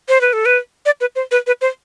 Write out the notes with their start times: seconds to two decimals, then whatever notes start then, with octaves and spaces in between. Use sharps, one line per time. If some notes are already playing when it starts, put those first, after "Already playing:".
0.08 C5
0.21 B4
0.33 A4
0.45 B4
0.86 D5
1.01 B4
1.15 C5
1.31 B4
1.47 B4
1.61 C5